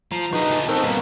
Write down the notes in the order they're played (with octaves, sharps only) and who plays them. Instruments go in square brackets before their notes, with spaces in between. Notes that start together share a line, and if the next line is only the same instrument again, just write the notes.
[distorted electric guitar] F3 [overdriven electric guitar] A#5
[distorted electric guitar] B1 G#4 [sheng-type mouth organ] D#4 B4 [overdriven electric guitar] F#4 [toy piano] C#6
[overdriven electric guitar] F3 A4
[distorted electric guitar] B3 C4 [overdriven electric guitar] D#4 [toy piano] A#4 C5 A5 [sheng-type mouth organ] C#6 E6
[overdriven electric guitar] G2 B2 [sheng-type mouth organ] A#3 B4 [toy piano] D#5